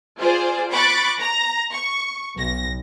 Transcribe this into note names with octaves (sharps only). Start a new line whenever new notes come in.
F4 G#4 C5 D5
B5 C#6 D6 F#6 A6
A#5 A#6
C#6
B1 A#6